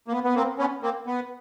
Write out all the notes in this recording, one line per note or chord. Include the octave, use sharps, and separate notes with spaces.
A#3
B3
B3
A#3 C4
B3 C#4
A#3 C4
B3